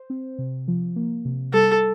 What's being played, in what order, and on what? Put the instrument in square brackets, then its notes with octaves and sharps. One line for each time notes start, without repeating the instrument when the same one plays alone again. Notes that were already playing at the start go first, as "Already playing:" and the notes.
Already playing: [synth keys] C5
C4
C3
F3
A#3
C3
[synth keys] G3 [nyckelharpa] A4